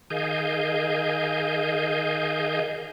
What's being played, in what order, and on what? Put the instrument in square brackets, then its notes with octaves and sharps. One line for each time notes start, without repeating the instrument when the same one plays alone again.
[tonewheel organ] D#3 G#4 D#5 F5 G#5 G6